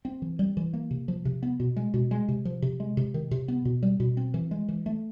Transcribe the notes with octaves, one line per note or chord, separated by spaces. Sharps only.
C4
E3
G3
E3
A#3
C3
F3
C3
B3
B2
G#3
B2
G#3
C3
F3
C3
G#3
C3
D#3
C3
B3
B2
G3
B2
C4
E3
G#3
E3
A3